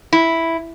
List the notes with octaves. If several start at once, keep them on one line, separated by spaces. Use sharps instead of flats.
E4